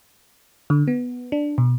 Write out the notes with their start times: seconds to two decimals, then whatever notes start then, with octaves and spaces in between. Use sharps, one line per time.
0.70 D3
0.88 B3
1.32 D4
1.58 B2